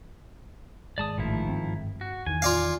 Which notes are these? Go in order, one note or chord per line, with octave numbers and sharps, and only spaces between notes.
G#1 G#3 D5 A5 D#6
A1 A2 D#3 F3 E4
G1 C4
F#4
E2 D#3 E3 G#5
F4 D5 F5